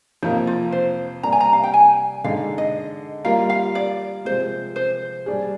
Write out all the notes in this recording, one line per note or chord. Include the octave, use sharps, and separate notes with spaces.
F2 C3 F3 A#3 D#4
F4
C5
C3 G3 A#3 D4 A#5
G#5
A#5
F5
G5
G#5
D3 G#3 D#4 F5
D#5
G3 A#3 F4 A#4 F5
F5
D5
C3 F3 G#3 C5
C5
G3 D4 G#4